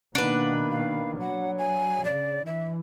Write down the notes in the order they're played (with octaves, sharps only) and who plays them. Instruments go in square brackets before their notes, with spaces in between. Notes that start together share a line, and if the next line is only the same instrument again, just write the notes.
[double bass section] B2 D#3 A#3 [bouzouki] D4 B4 [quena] F#5
[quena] F5
[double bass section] F#3 [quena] F#5
[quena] G#5
[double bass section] C#3 [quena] D5
[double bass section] E3 [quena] E5